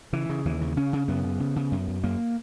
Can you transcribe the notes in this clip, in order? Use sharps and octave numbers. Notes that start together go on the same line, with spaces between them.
C#3 E3
C#3
D#2 E3
C#3
C#3 C#4
C#3
F#2 B3
C#3
C#3
C#3
F#2
F#2
F#2 A#3